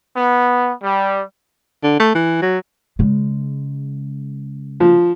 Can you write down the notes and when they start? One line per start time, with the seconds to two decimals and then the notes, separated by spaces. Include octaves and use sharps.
0.17 B3
0.83 G3
1.83 D3
1.99 A3
2.15 E3
2.42 F#3
2.99 C#3 G#3
4.80 F3